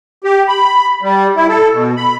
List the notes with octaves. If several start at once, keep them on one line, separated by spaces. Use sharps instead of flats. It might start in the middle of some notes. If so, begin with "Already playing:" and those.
G4
B5
G3
E4
A4
B2
B5